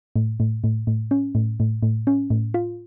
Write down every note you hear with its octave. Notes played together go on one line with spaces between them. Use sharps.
A2
A2
A2
A2
C#4
A2
A2
A2
C#4
A2
F4